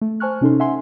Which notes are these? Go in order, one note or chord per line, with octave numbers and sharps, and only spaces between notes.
A3
C5 G#5 A5 C#6 F6 F#6
C3 C#4 D#4 A4 C6
E5 F#5 G#5 C6